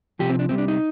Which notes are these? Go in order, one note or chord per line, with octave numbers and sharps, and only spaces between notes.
C2 C3 F3 G4
C4
D4
C2 C3 G3 C4
D4
D#4